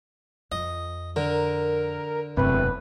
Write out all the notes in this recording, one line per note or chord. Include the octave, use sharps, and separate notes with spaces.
F2 D#5
D3 A#4
E1 F#2 C3 A3 B4